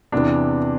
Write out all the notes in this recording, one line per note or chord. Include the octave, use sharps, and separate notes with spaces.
E2 C3 E3 D4